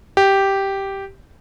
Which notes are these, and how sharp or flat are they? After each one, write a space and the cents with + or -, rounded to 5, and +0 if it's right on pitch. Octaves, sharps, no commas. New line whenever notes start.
G4 -5